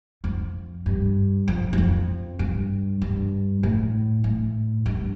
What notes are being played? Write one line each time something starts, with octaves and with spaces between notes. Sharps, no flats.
F2
G2
F2
E2
F2
G2
G2
A2
A2
G2